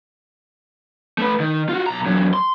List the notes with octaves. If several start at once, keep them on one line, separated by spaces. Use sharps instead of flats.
A3 B4
D#3
F4 F#4
B1 A#5
E2 F#3
C6